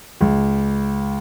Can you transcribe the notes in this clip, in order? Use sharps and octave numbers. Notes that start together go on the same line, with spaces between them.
C#2